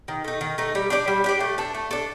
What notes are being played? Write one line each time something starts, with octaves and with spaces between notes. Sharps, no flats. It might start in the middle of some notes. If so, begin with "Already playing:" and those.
D#3
A3 D#4
D#3
A3 D#4
G3
D4 G4 D5
G3
D4 G4 D5
A3
D4 A4
A3
D4 A4